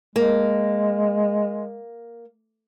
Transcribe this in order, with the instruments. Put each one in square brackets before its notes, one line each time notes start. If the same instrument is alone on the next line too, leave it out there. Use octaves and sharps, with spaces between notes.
[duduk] G#3 [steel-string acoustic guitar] A#3